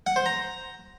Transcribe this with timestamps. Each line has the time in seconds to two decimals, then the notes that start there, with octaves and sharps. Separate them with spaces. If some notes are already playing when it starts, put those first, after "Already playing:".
0.07 F#5
0.16 C5
0.26 A#5